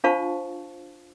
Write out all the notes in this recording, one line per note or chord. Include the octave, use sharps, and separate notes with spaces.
D4 F4 C5 F5 A5 C#6